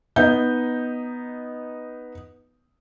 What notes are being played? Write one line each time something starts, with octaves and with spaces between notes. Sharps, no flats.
B3 D#4 G6